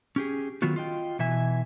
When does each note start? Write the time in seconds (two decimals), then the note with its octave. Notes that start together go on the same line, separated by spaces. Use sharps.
0.16 C#4 G4 G#4
0.62 D#3 F#3 B3 F4 F#4
0.76 F4 D#5 G5
1.19 B2 E3 E5 G#5